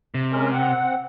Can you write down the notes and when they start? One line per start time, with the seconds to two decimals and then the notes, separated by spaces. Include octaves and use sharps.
0.14 C3
0.32 G#3 C#4 A#4
0.53 C4 F#5